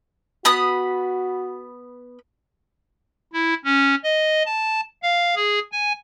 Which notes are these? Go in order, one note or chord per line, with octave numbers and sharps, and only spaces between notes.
B3 F#4 B5 D#6
E4
C#4
D#5
A5
F5
G#4
G#5